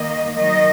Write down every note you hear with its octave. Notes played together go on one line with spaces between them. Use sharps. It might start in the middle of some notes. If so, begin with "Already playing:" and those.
Already playing: D#3 A#3 D#5
D#3 F#3 A#3 D#5